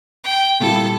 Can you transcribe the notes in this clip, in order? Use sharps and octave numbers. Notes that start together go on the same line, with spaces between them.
G5
A#2 G3 E4 A4